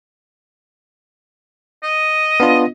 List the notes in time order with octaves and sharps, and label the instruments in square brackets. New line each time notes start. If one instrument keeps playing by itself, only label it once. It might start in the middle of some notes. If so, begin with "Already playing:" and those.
[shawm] D#5
[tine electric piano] B3 D4 F4